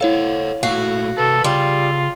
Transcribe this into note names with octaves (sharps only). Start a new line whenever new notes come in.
E4 A4 C5 C#5 F5 F#5
A#2 A3 E4 F#4 F5 C7
C3 A4 B4
C#3 G3 F4